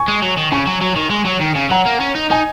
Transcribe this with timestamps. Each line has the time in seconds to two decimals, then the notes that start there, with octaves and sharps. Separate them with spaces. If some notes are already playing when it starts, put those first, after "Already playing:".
Already playing: G#5 C#6
0.08 G#3
0.22 F#3
0.37 D#3
0.52 C#3 G#5 C#6
0.67 F#3
0.82 F#3
0.96 D#3
1.11 G#3
1.26 F#3
1.41 D#3
1.56 C#3
1.71 F#3 F#5 A#5
1.86 A#3
2.01 C#4
2.15 D#4
2.30 D#4 D#5 G#5